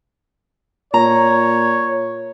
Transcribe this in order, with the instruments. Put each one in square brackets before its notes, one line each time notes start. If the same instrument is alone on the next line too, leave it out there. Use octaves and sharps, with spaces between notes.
[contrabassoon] A#2 [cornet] C#5 [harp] A#5